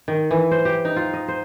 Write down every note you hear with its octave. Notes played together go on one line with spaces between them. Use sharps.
D#3
E3
C5
G4
D#4
F4
D#5
C5